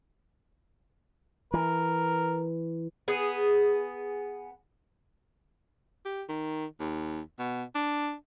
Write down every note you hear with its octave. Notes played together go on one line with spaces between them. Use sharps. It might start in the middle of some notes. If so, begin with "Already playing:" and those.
E3 A#4
B3 G#4
G4
D#3
D#2
B2
D4